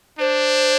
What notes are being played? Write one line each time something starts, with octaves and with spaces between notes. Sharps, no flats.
D4 C5